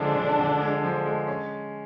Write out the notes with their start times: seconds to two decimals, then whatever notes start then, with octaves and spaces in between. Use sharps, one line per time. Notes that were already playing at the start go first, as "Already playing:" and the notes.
Already playing: D3 F3 G#3 D4
0.16 D3
0.39 D3
0.61 G#3
0.84 F3
1.06 G#3
1.27 C#4